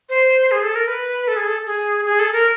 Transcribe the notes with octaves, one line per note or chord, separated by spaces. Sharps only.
C5
G#4
A4
A#4
B4
A4
G#4
A4
G#4
G#4
A4
A#4